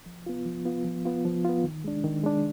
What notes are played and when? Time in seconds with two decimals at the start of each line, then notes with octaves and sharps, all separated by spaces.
0.06 F3
0.26 B3 F4
0.46 F3
0.65 B3 F4
0.85 F3
1.05 B3 F4
1.25 F3
1.45 B3 F4
1.64 D#3
1.84 G#3 D4
2.04 D#3
2.24 G#3 D4